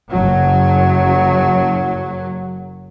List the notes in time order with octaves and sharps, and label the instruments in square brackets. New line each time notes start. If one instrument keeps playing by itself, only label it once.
[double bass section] F#1 F#3